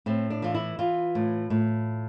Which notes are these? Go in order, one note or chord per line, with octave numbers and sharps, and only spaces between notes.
A2 C4
D4
E3 F4
E4
E3 F4
A2
A2